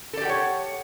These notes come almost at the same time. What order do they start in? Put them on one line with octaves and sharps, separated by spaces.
A4 D5 G4 F#5 C#5